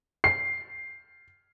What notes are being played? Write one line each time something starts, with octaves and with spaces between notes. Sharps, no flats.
C7